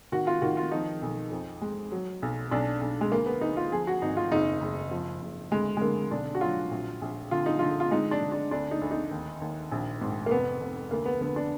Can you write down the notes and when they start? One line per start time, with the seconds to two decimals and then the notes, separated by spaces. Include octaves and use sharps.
0.12 D#3 F#4
0.27 F4
0.42 D#3 F#4
0.57 F4
0.72 F3 D#4
1.02 B1
1.31 F2
1.61 G#3
1.92 F#3
2.22 B1
2.51 B1 D4
2.81 B1
3.01 G#3
3.12 D2 A#3
3.26 B3
3.41 D2 D#4
3.57 F4
3.72 F3 G#4
3.87 F#4
4.02 G#1 D#4
4.17 F4
4.31 F#1 D#4
4.61 F#1
4.91 F3
5.22 F#1
5.51 D2 G#3
5.77 G#3
5.81 D3 A#3
6.11 B1 D4
6.35 F#4
6.41 F#3 F4
6.71 A#1
7.02 A#1
7.31 D3 F4
7.46 D#4
7.59 D3 F4
7.80 F4
7.91 G#3 D#4
8.11 D4
8.22 D3
8.32 D4
8.51 D2 D4
8.71 D#4
8.82 D2
8.91 D#4
9.11 D#2
9.42 D#2
9.72 A#1
10.01 G#2
10.26 A#3
10.31 F1 B3
10.61 F1
10.91 D2 A#3
11.06 B3
11.21 D3 B3
11.36 D4